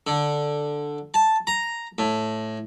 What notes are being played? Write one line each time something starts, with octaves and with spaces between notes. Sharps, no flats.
D3
A5
A#5
A2